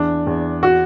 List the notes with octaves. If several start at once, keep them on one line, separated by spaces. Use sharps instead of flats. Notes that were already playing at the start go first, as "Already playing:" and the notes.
Already playing: E2 D4
E2
F#4